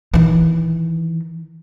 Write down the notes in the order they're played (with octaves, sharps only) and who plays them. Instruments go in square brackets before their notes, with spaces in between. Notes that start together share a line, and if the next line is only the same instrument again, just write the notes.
[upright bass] D#3 E3